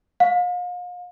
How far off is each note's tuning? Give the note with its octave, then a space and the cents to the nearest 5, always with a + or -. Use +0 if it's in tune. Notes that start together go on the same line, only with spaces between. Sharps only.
F5 +40